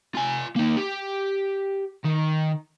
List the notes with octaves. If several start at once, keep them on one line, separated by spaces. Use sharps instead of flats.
F4 G#5
A#3 D#4
G4
D#3